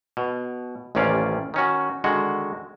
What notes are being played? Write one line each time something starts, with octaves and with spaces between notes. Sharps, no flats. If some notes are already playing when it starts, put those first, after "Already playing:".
B2
A1 D#2 C3 C#4 D5 F5
D#3 C#4 F#4
D3 D#3 G#3 F#4